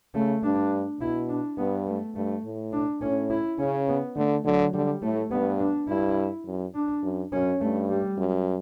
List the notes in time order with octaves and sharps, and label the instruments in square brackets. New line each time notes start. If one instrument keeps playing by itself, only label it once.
[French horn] C#3 [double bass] A3
[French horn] G2 [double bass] D4
[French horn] B2 [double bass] E4
[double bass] D4
[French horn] G2 [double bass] B3
[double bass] A3
[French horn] G2 [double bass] A3
[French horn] A2
[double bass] D4
[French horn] A2 [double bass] C#4
[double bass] E4
[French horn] C#3 [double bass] C#4
[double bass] B3
[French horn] D3 [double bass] A3
[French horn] D3 [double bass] F#3
[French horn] D3 [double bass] G3
[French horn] A2 [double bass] A3
[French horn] G2 [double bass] B3
[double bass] D4
[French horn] G2 [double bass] E4
[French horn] F#2
[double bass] D4
[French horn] F#2
[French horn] F#2 [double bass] C#4
[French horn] G2 [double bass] A3
[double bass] G3
[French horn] F#2